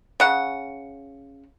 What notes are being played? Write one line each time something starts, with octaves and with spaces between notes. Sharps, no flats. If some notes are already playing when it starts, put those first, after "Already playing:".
C#3 F#5